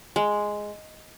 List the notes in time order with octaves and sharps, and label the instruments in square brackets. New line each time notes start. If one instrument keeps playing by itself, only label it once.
[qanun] G#3